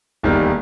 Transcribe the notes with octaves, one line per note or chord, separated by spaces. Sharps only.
E1 D#2 D#3 G3